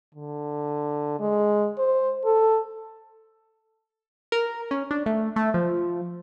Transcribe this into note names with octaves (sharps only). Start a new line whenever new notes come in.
D3
G#3
C5
A4
A#4
C#4
D4
A3
A3
F3